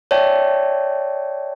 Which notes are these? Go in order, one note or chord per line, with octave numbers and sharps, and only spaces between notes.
C#5 D5 E5 G5 A5